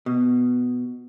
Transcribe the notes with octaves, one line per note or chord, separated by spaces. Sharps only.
B2